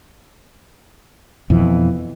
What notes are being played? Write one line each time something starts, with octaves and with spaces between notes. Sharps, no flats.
F2 B2 E3